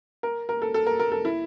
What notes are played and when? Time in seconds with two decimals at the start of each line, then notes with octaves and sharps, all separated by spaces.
0.23 A#4
0.49 A#4
0.62 A4
0.74 A4
0.86 A#4
1.00 A#4
1.12 A4
1.25 E4